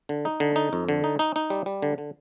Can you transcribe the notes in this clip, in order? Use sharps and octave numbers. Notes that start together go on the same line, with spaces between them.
D3
D#4
D3
D#4
F2
D3
D#4
D#4
D#4
G3
G3
D3
D3